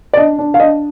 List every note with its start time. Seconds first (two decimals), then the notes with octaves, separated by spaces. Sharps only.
0.13 D5
0.17 D4 D#5
0.38 D4
0.54 F5
0.60 D4 D#5